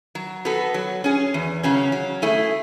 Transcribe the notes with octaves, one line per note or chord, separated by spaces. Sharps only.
F#3
B3 F#4 A4
F#3
C#4 G#4
E2
C#3 F#3 C#4
F#3
A3 E4 G#4